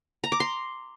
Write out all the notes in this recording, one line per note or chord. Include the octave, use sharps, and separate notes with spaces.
A#5
D6
C6